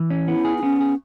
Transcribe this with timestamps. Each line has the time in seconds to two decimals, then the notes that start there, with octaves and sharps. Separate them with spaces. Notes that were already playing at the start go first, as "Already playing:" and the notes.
Already playing: E3
0.10 C#4
0.27 B3 E4
0.45 G#4
0.58 E4
0.63 B3 C#4
0.81 G#4